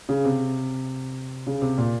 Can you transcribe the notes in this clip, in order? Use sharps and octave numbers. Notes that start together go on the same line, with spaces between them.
C#3
C3
C#3
C3
A#2